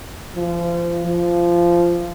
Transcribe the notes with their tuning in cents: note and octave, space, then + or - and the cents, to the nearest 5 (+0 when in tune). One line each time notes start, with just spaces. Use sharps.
F3 -30
F3 -15